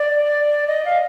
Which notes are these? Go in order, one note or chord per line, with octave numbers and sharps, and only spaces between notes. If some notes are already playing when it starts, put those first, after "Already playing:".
Already playing: D5
D#5
F5